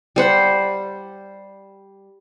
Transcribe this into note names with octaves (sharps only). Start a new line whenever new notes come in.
G3 C5 F#5